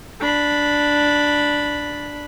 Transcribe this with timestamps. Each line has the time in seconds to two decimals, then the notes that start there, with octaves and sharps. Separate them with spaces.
0.20 D4 B5